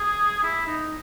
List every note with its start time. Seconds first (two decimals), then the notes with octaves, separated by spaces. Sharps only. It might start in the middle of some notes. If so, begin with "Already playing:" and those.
Already playing: G#4
0.43 E4
0.67 D#4